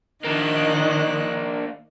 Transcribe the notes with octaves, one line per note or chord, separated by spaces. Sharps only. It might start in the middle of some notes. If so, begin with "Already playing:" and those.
D#3 A#3 D4 D#5 F#6